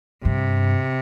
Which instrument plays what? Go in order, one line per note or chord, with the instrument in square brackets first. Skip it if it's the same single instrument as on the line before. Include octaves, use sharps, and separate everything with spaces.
[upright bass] G2 [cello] C3